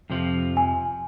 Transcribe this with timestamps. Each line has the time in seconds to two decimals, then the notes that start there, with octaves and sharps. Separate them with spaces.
0.10 F2 C3 F3
0.57 G#5